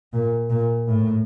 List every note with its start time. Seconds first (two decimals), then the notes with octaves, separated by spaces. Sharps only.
0.13 A#2
0.50 A#2
0.88 A2